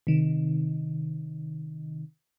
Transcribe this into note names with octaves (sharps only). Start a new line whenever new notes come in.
C3 D#3